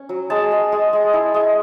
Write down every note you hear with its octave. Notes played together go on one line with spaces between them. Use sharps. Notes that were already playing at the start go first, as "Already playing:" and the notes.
Already playing: C#4
F#3
G#3 A5
G#3
G#3
G#3
E4
G#3